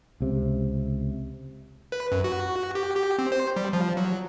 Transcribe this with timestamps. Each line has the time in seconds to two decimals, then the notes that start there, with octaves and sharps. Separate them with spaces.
0.20 C#2 C3
1.92 B4
2.12 F#2
2.24 F#4
2.75 G4
2.95 G4
3.19 C4
3.32 C5
3.56 G3
3.73 F3
3.97 F#3